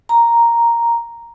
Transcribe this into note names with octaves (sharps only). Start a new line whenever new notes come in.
A#5